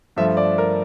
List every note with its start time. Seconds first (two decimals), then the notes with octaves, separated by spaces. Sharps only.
0.16 G2 F3 A3 E5
0.37 D5
0.58 A#4